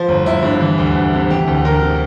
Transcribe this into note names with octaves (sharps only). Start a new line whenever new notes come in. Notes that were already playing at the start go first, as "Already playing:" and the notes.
Already playing: F3 C5
G1
G1 E4
G2
E3
D2
D2
C3
E3 G4
D2
D2 A#4
C3